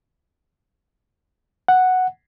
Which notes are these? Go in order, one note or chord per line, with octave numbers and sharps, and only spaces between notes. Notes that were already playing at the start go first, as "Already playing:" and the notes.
F#5